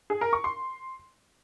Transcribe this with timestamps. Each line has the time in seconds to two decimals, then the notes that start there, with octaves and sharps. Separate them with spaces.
0.10 G#4
0.21 A#4
0.33 C#6
0.44 C6